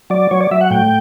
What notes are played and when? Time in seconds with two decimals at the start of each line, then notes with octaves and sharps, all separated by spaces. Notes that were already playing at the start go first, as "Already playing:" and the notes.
0.10 F#3 D5
0.31 F#3 C#5
0.41 D5
0.51 F#3 E5
0.61 F#5
0.71 A2 G5